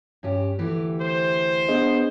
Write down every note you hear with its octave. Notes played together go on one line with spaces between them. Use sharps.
G2 C#4 G4
D2 E3 G4
C5
B3 D4 G#4 D#5